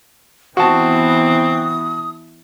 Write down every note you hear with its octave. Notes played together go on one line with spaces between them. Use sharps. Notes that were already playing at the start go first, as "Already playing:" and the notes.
E3 B3 C4 F#4 A5 D#6